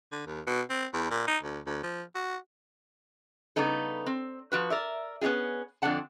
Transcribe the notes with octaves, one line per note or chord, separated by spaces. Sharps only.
D3
D#2
B2
C4
E2
A#2
D#4
D2
D2
F3
F#4
C#3 G3 B3 D#4 A4
C4
F3 F#4 B4
A#4 D5 E5
B3 C#4 D#4 F4 G#4
F2 D3 A#3 D4 F#5 A5